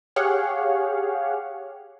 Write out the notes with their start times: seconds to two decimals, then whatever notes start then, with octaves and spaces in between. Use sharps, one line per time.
0.16 G4 G#4 C#5 F5 F#5